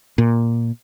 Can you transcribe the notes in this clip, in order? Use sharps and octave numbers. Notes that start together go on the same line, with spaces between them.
A#2